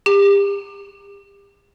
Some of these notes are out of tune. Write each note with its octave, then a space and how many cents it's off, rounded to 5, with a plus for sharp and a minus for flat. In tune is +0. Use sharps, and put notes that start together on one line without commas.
G4 +35